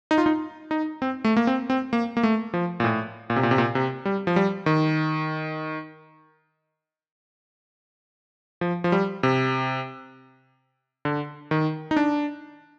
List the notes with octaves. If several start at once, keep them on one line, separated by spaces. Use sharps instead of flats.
D#4
F4
D#4
D#4
C4
A3
A#3
C4
C4
A#3
A#3
A3
F3
A#2
A2
A#2
C3
A#2
C3
A#2
C3
G3
F3
G3
D#3
F3
F3
G3
C3
D3
D#3
D#4
D4